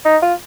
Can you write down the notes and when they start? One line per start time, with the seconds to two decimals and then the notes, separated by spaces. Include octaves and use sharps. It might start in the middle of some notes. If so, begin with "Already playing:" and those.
0.05 D#4
0.22 F4